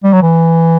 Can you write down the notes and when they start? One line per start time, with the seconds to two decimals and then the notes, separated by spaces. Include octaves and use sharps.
0.04 G3
0.13 F#3
0.22 E3